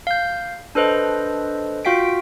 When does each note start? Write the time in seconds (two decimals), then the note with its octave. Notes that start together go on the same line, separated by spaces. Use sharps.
0.07 F5 G6
0.75 D4 A4 B4 C5 D#5
1.85 F4 F#4 F5 G5 B6 D7